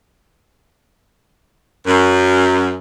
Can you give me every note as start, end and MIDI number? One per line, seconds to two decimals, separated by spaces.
1.86 2.76 42